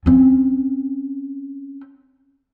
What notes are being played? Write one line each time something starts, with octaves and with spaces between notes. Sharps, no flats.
C4 C#4